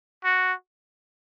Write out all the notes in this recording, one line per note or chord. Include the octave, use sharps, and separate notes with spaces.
F#4